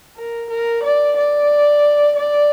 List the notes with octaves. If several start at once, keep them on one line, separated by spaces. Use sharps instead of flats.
A#4
A#4
D5
D5
D5